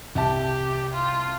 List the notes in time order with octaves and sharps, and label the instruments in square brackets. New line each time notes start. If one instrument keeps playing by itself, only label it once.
[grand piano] C2 E5 A5 [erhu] G4
[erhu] F4